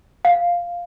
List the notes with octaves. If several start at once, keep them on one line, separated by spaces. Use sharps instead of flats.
F5